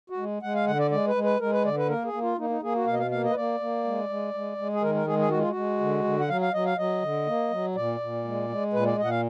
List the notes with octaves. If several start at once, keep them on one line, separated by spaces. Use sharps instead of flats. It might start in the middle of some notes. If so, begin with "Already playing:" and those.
F#4
G#3
G#3 F#5
F5
D3 F#5
D5
G#3 D5
B4
G#3
B4
G#3 A#4
B4
D3 D5
B4
A#3 A#4
G#4
A#3
F4
A#3 D#4
D#4
A#3 G#4
F#4
B2 F5
D#5
F5
A#3 F5
D#5
B4
A#3 D5
A#3
G#3
G#3
G#3
G#3
G#4
D#3 A#4
A#4
G#3 G#4
G#4
G#3 F#4
F4
F#4
G#3
D3
D3
F#5
F#3 F5
F5
F#3 D#5
F5
F#3 D#5
D3
A#3
F#3
A#2 D5
A#2
G#3
G#3
A#2 B4
D5
A#2 D#5
F#5
F5